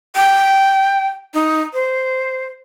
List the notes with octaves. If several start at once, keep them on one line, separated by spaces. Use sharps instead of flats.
G5
D#4
C5